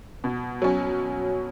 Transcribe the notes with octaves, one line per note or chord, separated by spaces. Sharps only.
B2
F#3 C#4